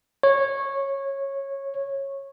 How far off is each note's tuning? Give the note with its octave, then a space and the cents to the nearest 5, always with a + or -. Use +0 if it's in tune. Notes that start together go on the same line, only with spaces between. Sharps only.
C#5 -15